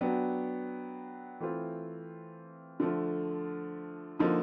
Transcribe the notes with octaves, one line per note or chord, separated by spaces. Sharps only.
F#3 B3 D4 G4
E3 A3 C4 F4
D3 F3 A3
D3 F3 A#3 D#4